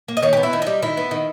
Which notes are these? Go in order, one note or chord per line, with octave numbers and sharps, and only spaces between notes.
A#3
D#5
D#3 C#5
G4
B3
E4
D#3
G3 D#4
D#3 E4
B3
D#3